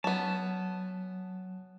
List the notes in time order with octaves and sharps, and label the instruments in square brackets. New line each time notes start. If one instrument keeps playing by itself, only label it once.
[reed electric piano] F#3 [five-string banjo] B3 C#4 [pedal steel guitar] A5